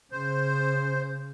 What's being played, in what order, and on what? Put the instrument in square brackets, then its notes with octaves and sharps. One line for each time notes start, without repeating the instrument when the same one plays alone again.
[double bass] C#3 [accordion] C5